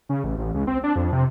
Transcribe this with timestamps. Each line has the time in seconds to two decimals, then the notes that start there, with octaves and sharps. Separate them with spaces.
0.09 C#3
0.24 A1
0.38 A1
0.54 C#2
0.67 C4
0.84 D4
0.96 F2
1.12 C3